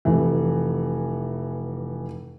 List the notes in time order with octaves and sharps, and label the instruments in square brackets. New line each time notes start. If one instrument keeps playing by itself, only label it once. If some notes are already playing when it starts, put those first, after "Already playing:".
[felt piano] F1 E3